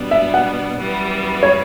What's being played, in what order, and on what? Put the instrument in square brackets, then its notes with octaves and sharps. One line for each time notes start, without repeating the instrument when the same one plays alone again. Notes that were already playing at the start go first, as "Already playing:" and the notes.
Already playing: [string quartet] B2 G3 B3 D4
[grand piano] E5
F#5
[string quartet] F#2 E3 G3 B3
[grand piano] C#5